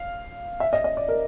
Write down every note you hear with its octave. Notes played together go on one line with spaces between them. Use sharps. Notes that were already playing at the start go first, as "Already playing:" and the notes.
Already playing: F5
E5
D#5
D#5
D5
A#4